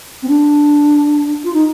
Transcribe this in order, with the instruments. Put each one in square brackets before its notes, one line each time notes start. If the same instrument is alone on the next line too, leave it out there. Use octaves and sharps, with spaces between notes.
[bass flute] C4
D4
F4
D#4